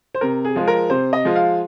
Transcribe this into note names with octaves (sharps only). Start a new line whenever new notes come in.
C5
C3 A#4
G#4
F3 G#3 F4
A#4
C3 C5
D#5
F3 G#3 F4
F5